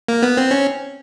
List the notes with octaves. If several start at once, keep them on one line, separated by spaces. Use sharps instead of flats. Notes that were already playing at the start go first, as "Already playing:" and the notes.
A#3
B3
C4
C#4